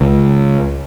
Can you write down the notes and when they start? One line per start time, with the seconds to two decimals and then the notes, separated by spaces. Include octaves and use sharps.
0.01 C#2